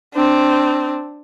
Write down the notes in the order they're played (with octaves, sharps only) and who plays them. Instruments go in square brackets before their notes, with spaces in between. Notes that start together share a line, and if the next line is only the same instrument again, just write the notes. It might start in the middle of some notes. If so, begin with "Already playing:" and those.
[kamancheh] C4 D4